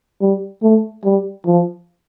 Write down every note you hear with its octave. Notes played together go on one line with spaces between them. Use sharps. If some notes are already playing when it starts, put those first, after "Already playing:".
G3
A3
G3
F3